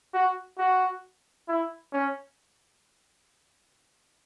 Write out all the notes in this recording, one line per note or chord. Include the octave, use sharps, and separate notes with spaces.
F#4
F#4
E4
C#4